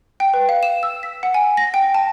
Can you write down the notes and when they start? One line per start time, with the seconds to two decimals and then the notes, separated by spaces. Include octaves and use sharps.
0.20 G5
0.34 B4
0.49 F5
0.63 E7
0.83 E6
1.03 B6
1.23 F#5
1.34 G#5
1.57 A#6
1.74 G5
1.94 A5